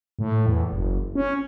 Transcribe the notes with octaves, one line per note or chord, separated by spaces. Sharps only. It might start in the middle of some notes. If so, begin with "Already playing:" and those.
A2
E2
F#1
C#4